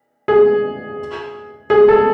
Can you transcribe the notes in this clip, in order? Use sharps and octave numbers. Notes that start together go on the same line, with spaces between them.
G#4
G#4
A4